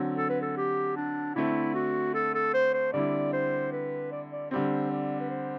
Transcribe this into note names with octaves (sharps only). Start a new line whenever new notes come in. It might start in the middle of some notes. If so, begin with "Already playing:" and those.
Already playing: D3 F#3 C4
A4
B4
A4
G4
D4
D3 A3 C4 E4
F#4
A4
A4
C5
C5
D3 G3 C4 E4 D5
C5
B4
D5
D5
D3 G3 C4 C5
D5
B4
C5